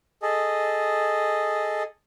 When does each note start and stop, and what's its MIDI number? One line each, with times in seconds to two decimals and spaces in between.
0.22 1.83 68
0.22 1.83 69
0.22 1.83 75